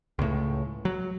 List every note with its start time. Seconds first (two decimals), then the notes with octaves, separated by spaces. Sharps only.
0.19 C#2 A2
0.85 F#3